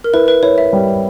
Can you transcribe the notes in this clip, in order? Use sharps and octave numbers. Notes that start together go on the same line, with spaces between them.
A#4
E4 B4
B4
E4 C#5
E5
G3